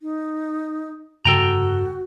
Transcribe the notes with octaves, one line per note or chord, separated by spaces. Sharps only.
D#4
F1 G2 C#3 F#4 A4 G5 A#5